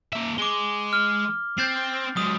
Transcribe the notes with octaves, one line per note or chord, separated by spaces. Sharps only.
A#3 E5
G#3 D6 G7
F6
C4 G6 A6 C7
G#2 F#3 D#6